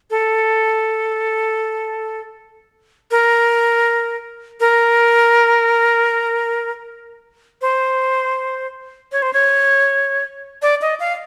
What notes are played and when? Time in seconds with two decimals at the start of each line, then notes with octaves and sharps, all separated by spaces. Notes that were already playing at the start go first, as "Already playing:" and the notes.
0.10 A4
3.11 A#4
4.60 A#4
7.61 C5
9.12 C#5
9.22 C5
9.33 C#5
10.62 D5
10.82 D#5
11.00 F5